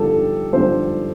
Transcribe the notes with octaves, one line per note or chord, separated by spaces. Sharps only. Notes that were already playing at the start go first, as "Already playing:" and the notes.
Already playing: G2 D3 F3 G4 A4
G2 D3 F3 C5